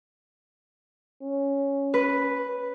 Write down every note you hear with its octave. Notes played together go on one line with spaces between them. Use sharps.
C#4
B4